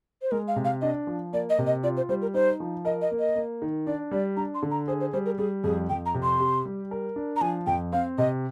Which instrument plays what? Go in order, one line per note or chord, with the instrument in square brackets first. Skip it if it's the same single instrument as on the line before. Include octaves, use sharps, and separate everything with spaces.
[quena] C5
[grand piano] G#3 [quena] A#4
[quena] F5
[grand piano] C3
[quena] F5
[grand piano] D4 [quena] D#5
[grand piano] F3
[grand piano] A#3 [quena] D5
[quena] D#5
[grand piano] C3
[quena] D#5
[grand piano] F4 [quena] D5
[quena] C5
[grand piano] G3 [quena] C5
[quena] A#4
[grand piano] D#4 [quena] C5
[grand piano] F3
[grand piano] A#4 [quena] D#5
[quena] D#5
[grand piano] A#3
[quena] D#5
[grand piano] A#3
D#3
[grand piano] D4 [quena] D5
[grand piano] G3 [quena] D5
[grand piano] D4 [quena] A#5
[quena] C6
[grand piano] D3
[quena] A#5
[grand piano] G#4 [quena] C5
[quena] C5
[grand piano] G3 [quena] C5
[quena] A#4
[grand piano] G3 [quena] G#4
[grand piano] F2 [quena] G#4
[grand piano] F2 [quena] G5
[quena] A#5
[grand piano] C3
[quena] C6
[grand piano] G4
G3
A#4
D4
[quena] A#5
[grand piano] F3 [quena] G#5
[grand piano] F2 [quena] G5
[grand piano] C4 [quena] F5
[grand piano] C3 [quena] D#5